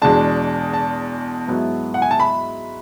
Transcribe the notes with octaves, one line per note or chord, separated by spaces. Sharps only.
E2 B2 G#3 D4 A5
A5
G#2 F#3 B3 E4
F#5
G#5
A5
B5